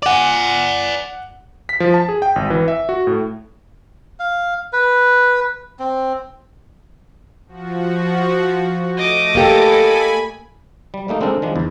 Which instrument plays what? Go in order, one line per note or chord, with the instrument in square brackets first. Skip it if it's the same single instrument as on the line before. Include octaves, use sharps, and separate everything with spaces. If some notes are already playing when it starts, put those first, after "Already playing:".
[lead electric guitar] D5 G#5 [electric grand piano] F#5 D6
[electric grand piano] B6
F3
A5
G#4
G5
G#1
E3
E5
F#4
A2
[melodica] F5
B4
C4
[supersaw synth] F3 F#4
[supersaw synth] A3 [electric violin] D#5 D6
[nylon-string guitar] A#3 G4 [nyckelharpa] A4 [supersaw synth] G#5 B5
[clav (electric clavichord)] G3
G3 A3 A#3 D#4
G#3 C4 D4 D#4 A4 A#4
D#3 F3 G#3 D4
E2